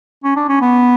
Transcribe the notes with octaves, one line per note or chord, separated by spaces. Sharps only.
C#4
D4
C#4
B3